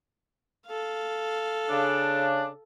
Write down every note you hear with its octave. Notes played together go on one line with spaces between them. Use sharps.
A4 F5
C#3 D4